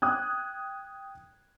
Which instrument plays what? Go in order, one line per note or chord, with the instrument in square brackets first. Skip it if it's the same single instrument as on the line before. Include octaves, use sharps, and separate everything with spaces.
[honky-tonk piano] G5 D#6 F#6 G#6